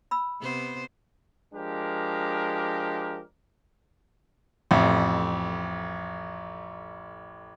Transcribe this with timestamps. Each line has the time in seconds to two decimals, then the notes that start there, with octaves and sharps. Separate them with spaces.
0.11 B5 E6
0.41 C3 B3 C5
1.53 F3 G#3 D4 G4 A#4
4.71 A1 F2